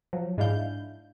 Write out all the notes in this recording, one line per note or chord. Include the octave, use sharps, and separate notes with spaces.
F3 F#3
G#2 G#3 D4 E4 F5 G6